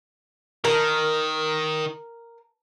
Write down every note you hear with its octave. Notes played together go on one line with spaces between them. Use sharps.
D#3 A#4